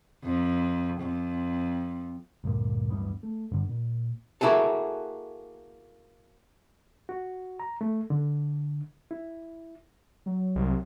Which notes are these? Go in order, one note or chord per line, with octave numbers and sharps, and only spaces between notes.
F2
F2
D2 G2 A#2 A#3
D1 G2 E3 B3
A3
G2 D3
A#2
A#3 E4 F#4 G#4 A4
F#4
A#5
A3
D3
E4
F#3
C2